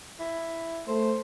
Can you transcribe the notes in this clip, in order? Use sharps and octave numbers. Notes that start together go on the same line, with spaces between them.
E4
A3 C5